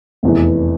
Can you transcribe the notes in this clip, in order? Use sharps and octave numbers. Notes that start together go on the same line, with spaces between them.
F1 E2 E3